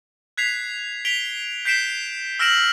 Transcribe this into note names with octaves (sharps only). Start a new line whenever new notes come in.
F#6 G#6 B6 C7 F7
B6 D7 F7 G7
G6 B6 C7 D7 E7 G7
E6 F6 A#6 D7 E7 F#7